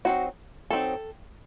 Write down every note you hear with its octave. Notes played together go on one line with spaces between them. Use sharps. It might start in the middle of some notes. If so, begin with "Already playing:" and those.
F#3 C4 D#4 F#4
F#3 C4 D#4 A4